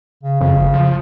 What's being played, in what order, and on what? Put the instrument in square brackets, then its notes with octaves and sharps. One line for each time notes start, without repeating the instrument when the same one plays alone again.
[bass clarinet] C#3
[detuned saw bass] F2 [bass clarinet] C#3
[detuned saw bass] G1
F3